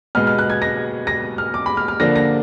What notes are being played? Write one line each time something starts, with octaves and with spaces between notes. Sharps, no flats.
B2 G#3 B3 F6
F6
F#6
G#6
A#6
A#6
F6
D6
B5
F6
F6
D3 F3 A#3 D4 A#6
A#6